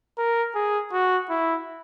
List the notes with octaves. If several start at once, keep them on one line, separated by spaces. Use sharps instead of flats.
A#4
G#4
F#4
E4